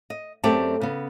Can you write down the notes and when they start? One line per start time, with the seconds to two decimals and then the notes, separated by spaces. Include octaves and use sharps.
0.10 D#5
0.44 F#2 A3 C4 G4 D5 A5
0.82 C#3 B3